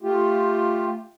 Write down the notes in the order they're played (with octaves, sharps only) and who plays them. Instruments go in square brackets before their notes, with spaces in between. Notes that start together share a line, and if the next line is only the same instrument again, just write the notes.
[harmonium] A3 F4 G4